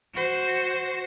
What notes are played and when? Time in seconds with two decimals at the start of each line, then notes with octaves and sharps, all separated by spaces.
0.14 F#4 C5